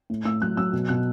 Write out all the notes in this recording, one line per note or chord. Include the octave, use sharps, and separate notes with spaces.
A2
A2 E6
F#3 F#6
F#3 E6
B2
B2 F#6